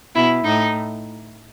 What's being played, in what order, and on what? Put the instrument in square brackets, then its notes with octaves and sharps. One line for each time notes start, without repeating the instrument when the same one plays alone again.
[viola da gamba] B2 [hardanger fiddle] E4
[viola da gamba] A2 [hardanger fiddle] D#4